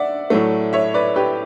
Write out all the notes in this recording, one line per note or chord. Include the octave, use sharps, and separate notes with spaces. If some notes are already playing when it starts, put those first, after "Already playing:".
Already playing: D5 E5 F#5
A2 F#3 A3
C#5 E5
B4 D5
G4 B4